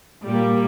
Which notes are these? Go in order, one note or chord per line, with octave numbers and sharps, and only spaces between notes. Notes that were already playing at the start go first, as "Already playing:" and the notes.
A#2 G3 A#3